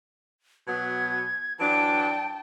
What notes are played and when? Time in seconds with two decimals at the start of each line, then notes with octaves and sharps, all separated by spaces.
0.68 B2 F#3 B3 G#6
1.60 E3 F#3 D4 G5 A5 D7